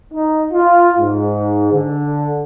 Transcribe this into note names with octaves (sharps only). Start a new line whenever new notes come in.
D#4
F4
G#2
D3